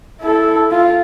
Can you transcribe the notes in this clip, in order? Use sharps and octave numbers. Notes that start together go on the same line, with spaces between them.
E4 A4
F4